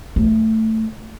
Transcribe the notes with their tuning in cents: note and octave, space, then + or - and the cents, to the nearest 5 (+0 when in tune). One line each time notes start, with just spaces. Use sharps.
A3 +10